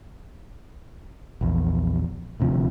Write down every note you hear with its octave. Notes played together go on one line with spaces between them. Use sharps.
A#1 E2
D#1 D2 C3 F3